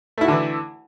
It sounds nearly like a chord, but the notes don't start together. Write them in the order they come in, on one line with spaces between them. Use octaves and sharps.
A3 E4 F#4 D3 E3